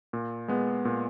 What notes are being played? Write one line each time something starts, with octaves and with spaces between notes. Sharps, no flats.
A#2
G#3 B3
A#2